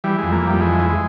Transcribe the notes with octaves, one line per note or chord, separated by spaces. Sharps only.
E3 G3
F2 G#3
A#3
F2 G3
E3 G#3
E3
G#3